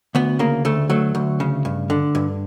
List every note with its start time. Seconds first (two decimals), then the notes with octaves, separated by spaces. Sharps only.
0.15 D2 B3
0.39 C#3 A#3
0.65 D2 A3
0.90 F#3 A3
1.15 D2
1.40 C#3
1.65 G2
1.90 D3
2.15 G2